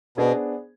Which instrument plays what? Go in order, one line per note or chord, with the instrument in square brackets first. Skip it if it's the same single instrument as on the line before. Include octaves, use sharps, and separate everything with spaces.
[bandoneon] B2 [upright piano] B3 D4 G#4 C5